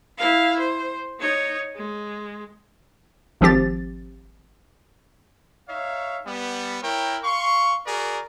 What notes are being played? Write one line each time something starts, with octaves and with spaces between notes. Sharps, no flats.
E4 F5
C5
D#4 C#5
G#3
G#1 F3 C4 G4 A6
D#4 C#5 E5 F5
G3 B3
E4 A#4 C#5 G5
F5 C6 C#6
F#4 G#4 A#4 D5